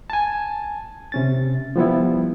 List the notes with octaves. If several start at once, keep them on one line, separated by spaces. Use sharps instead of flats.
G#5 A5
C3 C#4 A6
F3 G3 B3 E4